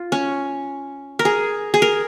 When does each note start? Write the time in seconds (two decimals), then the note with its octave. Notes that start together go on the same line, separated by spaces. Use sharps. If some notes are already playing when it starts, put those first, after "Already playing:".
Already playing: F4
0.12 C#4
1.19 A#4
1.25 G#4
1.74 G#4
1.82 A#4